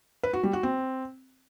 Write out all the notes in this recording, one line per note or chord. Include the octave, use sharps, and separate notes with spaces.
B4
F#4
G3
F#4
C4